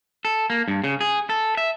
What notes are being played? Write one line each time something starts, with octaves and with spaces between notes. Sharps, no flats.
A4
A#3
G2
C#3
G#4
A4
E5